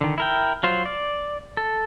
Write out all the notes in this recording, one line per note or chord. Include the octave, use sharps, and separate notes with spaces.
D3 D#3
E4 A#4 G5
F#3 F4 C5
D5
A4